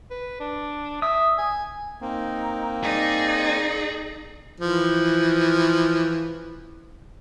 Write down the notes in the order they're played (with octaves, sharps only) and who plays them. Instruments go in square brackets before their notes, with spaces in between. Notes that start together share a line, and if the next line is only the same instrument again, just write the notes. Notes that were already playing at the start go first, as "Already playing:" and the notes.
[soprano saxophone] B4
D4
[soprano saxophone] E5 [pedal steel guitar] D#6
[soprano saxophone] G#5
[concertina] A#3 C4 [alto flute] D#4
[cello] D#4 [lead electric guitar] G#4 [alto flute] D5
[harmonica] E3 F3